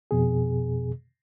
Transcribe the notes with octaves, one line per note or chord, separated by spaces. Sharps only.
F2 B2 G#4